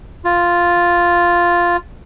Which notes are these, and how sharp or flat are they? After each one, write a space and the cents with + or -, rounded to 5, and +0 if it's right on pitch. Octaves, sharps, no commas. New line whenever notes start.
F4 +0